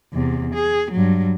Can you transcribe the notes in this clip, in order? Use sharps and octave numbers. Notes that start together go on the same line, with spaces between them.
E2 C3
G#4
G2 F#3